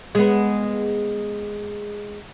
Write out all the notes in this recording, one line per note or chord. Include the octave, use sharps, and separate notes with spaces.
G#3 B3